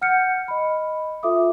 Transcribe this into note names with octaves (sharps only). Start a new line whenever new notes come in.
F#5 F6 G6 C#7
D#5 B5
F4 A4 E5 D6 D#6